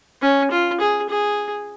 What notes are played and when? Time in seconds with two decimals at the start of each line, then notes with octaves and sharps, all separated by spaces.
0.22 C#4
0.51 F4
0.80 G#4
1.10 G#4